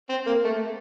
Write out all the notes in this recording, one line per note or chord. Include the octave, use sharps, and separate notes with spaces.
C4
A#3
A3